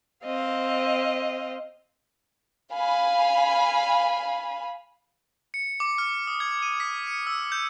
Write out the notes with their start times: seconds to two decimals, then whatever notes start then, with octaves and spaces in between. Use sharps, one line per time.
0.24 C4 D#5 F5
2.73 F5 G#5 B5
5.54 C#7
5.80 D6
5.98 F6
6.27 D#6
6.40 G#6
6.62 D#7
6.80 B6
7.07 C#7
7.27 E6
7.52 G6